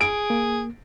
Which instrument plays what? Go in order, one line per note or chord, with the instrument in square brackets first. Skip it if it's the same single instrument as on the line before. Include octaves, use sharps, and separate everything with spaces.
[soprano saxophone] G#4 [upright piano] D7
[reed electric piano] A#3